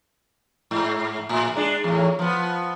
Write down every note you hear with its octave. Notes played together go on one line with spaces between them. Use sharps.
G#2
A2
G#3 D4
E2 A2
F3 B3